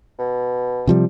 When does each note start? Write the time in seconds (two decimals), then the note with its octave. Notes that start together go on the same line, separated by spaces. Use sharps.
0.19 B2
0.87 C3 F3 G3